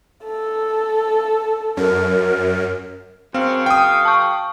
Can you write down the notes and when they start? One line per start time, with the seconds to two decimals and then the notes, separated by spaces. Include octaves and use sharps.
0.25 A4
1.77 F#2 A#4
3.34 F#2 C#3 C4 F5
3.66 G5 D#6
4.05 A5 C#6